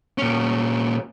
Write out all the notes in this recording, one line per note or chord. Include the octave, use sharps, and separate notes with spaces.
A#2 C#4